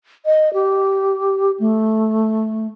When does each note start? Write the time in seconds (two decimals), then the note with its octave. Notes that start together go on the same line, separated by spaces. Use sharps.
0.26 D#5
0.54 G4
1.60 A3